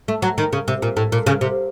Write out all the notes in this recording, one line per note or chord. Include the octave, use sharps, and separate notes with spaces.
A3
F#3
D#3
C#3
C3
A#2
A2
A#2
C#3
C3